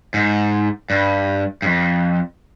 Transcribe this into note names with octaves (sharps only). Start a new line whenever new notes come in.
G#2
G2
G2
F2